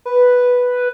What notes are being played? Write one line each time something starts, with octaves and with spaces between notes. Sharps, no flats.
B4